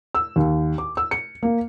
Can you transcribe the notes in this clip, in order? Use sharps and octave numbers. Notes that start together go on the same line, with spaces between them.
E6
D#2
D6
E6
C#7
A#3